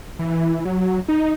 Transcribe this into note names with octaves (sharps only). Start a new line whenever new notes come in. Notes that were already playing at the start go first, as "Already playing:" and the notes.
E3
F#3
D#4